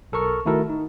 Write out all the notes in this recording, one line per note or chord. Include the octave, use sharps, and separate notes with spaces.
B1 A4 A#4 C#6 F6
D#3 A3 E4 F#4 A4 A#4
D#4